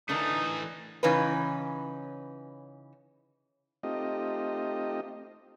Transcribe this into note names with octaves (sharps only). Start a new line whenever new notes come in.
D3 E3 A3 D4 D#4 A#4
C#3 E3 C#4 D#4 B4
A3 C4 D#4 F4 G4 D#5